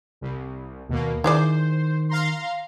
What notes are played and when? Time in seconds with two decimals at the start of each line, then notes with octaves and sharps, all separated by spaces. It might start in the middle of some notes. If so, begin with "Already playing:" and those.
0.21 C2
0.90 D#2 B2 A#3
1.24 D#3 E4 G#4 C5 D5
2.09 F5 A#5 C6